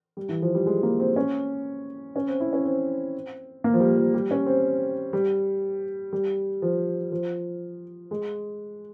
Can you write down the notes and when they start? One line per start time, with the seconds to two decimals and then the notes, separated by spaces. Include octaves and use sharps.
0.17 G3
0.29 E3
0.42 F3
0.55 G3
0.66 G#3
0.83 A#3
0.99 C4
1.16 C#4
2.16 C#4
2.27 C4
2.40 E4
2.53 C#4
2.64 C4
3.64 A#3
3.74 F3
3.80 G3
3.97 F3
4.14 G3
4.31 C#4
4.46 C4
5.13 G3
6.13 G3
6.62 F3
7.12 F3
8.11 G#3